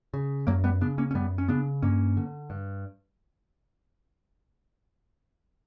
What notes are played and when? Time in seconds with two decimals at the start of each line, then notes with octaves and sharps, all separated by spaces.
0.14 C#3
0.47 F#2 F#3 A#3
0.64 G3 B3
0.81 C#3 B3 D4
0.98 A#3 C#4
1.11 C#4
1.15 F#2 G3 B3
1.38 C#4
1.48 C#3 B3 D4
1.82 G2 A#3 C#4
2.17 D3
2.50 G2